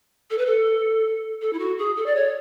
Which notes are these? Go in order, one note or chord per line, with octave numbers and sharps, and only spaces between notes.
A4
B4
A4
A4
E4
F#4
G#4
A4
D5
C#5